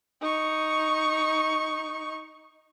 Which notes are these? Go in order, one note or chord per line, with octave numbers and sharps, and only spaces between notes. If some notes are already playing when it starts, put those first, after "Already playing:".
D#4 C#6